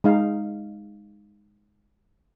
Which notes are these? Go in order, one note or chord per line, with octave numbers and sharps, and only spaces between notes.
G#3 D#4 F5